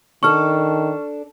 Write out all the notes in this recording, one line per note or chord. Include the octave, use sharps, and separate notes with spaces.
D#3 D4 A4 C#6 F6